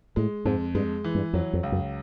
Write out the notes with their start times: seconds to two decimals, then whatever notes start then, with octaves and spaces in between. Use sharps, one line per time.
0.16 A2 G#3
0.45 F2 G#2
0.75 G2 G#3
1.04 E3
1.15 G2
1.33 F2 F#3
1.53 F2
1.63 C#2
1.72 F#2